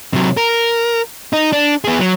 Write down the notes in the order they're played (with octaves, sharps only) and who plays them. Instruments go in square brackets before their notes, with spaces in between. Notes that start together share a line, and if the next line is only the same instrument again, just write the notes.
[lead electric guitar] C3 F#3
A#4
D#4
D4
B3 G#4
F#3